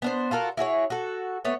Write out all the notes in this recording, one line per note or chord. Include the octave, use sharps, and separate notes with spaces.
B3 D4 C5
F4 F#4 A4 A#4
E4 F#4 G#4 C#5
F#4 A4
A3 B3 C#5